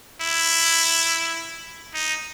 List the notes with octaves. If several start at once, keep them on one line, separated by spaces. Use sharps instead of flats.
E4
D#4